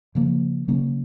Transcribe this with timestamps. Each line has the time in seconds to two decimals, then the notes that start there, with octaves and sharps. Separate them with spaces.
0.15 C#3 F3 A#3
0.68 C#3 F#3 A#3 C#4